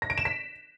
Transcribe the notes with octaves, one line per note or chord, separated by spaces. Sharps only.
A#6
D7
E7
B6